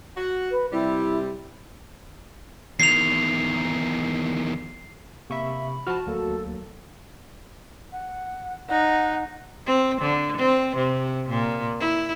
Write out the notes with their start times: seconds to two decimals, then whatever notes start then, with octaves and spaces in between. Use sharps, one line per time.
0.16 F#4
0.51 B4
0.72 C3 G3 E4
2.80 E2 D#3 C7 F7
5.30 C3 A#3 E5 B5 C#6
5.87 F3 F#4 F#5 A5 F6
6.06 D2 F#3 A#3 A4
7.92 F#5
8.69 D#4 F#5
9.66 C4
10.01 D3
10.37 C4
10.76 C3
11.29 A#2
11.79 E4